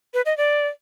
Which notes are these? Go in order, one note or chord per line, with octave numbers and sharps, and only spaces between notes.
B4
D#5
D5